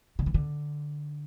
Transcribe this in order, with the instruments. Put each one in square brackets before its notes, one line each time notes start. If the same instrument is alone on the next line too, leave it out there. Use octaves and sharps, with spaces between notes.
[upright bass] D3
E3
D3